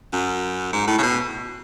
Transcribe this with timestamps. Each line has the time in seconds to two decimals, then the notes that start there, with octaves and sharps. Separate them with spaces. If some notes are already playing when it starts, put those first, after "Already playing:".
0.13 F#2
0.73 G#2
0.88 A2
0.98 C#3
1.03 B2